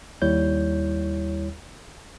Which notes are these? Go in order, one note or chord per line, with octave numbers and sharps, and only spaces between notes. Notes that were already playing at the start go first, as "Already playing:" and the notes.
D#2 G3 E4 C#5 G6